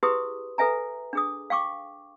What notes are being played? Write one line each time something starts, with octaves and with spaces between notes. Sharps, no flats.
E4 G4 G#4 B4 C6 D#6
A4 B4 E5 G#5 A#5
D4 G#4 D#6
F5 G5 C#6 D6